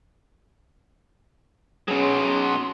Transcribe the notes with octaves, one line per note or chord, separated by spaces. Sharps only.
B2 F#3 C#4 G#4
C6